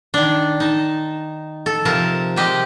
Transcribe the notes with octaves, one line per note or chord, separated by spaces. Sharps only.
D#3 D4
D#4 A5
A4
C3 F3 A#4 A5
C3 G#3 G4 D#5